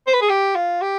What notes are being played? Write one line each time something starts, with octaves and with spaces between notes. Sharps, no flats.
C5
B4
G#4
G4
F4
G4